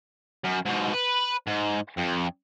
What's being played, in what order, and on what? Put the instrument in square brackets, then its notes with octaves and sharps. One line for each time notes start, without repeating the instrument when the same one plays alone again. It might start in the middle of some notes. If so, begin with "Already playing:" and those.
[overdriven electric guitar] F#2
G#2 B2
B4
G#2
F2